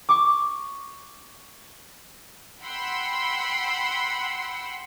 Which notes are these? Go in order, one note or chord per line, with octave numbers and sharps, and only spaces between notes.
C#6 D6
F#5 G5 B5 C6 E6